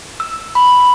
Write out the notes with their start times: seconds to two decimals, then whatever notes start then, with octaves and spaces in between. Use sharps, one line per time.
0.20 E6
0.55 B5